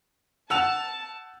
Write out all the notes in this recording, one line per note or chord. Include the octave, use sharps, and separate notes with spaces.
F#5 A5 E6 F7